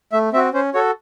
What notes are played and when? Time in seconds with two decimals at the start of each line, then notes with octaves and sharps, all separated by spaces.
0.12 A3 E5
0.33 C4 E5
0.36 F#4
0.53 C#4 C5
0.74 F#4 A4 C#5